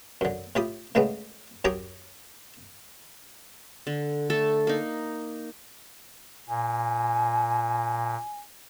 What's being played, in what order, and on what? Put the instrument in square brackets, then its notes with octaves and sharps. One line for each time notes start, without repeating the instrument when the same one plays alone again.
[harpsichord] F#2 D3
A2 F4 G4 B5 D#6
A2 C#3 G#3 A3 B3
F#2 G4 C#5 G5 A#5 D#6
[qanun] D3
A3 A4
A#3 D#4
[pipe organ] A#2 [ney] G#5